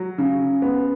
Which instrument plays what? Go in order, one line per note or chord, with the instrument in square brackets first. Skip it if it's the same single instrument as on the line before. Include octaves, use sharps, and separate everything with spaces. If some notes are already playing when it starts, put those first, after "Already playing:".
Already playing: [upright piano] F#3
C#3
B3